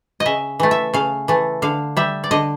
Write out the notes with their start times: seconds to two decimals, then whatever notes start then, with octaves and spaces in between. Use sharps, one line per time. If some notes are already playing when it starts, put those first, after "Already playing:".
0.20 D#5
0.26 C#3 E5
0.60 E3 A3
0.71 E5
0.94 C#3 F5
1.28 E3 A3
1.62 D3 F5
1.97 G3 E5
2.24 D5
2.31 D3 D#5